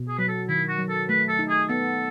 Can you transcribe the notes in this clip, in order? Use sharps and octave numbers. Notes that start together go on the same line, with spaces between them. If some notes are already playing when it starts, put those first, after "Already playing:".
Already playing: B2
G#4
F#3 B4
A4
D#3 E4
F#4
F#3
A4
A3 B4
A4
D#4
G#4
B3 A4